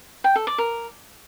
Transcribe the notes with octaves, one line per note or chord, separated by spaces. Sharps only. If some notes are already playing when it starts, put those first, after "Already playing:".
G5
A4
D5
A#4